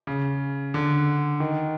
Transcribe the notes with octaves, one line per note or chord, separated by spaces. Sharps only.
C#3
D3
D#3